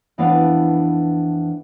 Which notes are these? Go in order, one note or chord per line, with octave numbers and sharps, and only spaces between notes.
F2 E3 B3 D4 D5 F5